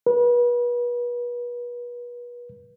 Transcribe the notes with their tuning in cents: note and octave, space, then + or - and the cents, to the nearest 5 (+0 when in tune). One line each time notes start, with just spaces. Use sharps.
B4 -35